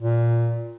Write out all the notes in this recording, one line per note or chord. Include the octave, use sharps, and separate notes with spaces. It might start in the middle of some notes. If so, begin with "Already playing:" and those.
A#2